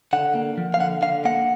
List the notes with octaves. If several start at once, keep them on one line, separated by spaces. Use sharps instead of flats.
D3 F#5
A#3
F3
F5
D3 F#5
D3 F5
A#3 F#5